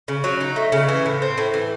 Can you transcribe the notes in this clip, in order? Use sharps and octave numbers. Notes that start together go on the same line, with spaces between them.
C#3
F#3
D#4
A3
C#3
E3
A2
C4
A2
E3